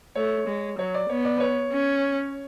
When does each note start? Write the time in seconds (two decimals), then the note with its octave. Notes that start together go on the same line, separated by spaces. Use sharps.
0.15 A3 C#5
0.47 G#3
0.78 F#3 C#5
0.94 D5
1.09 B3 C#5
1.25 D5
1.37 B4
1.40 C#5
1.72 C#4